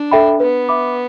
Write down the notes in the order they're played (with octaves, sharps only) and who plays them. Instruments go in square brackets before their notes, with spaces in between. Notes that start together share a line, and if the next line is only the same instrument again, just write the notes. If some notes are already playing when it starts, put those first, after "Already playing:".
Already playing: [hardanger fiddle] D4
[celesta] A4 E5 G5 B5
[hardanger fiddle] B3 [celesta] B4
[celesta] E5 B5 D6